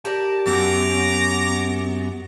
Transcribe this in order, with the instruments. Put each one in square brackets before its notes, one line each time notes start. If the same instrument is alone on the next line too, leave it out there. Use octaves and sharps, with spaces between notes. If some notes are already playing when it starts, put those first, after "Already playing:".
[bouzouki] G4 A#4 D5 [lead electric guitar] A5
[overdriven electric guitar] F#2 [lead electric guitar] B3 [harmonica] A#5 D6